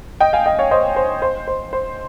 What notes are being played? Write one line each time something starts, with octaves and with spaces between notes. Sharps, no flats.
D#5 G5
F5 G#5
D#5 G5
C#5 F5
C5 D#5
C5
C5
C5
C5